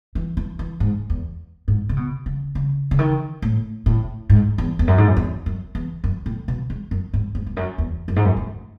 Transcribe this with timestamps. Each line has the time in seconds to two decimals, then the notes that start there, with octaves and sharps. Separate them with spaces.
0.15 E3
0.37 E3
0.59 E3
0.80 G#2
1.10 E2
1.68 G#2
1.89 C#3
1.97 B2
2.26 C#3
2.55 C#3
2.91 C#3
2.99 D#3
3.42 A2
3.86 A2
4.30 G#2
4.58 E2
4.79 E2
4.87 F#2
4.98 G#2
5.07 F#2
5.17 E2
5.46 F#2
5.75 E2
6.04 F#2
6.26 A2
6.48 B2
6.70 G#2
6.91 F#2
7.14 G#2
7.35 G#2
7.46 E2
7.57 F#2
7.78 E2
8.08 F#2
8.16 G#2
8.25 F#2
8.37 A2